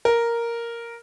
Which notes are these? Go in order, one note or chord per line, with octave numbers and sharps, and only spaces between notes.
A#4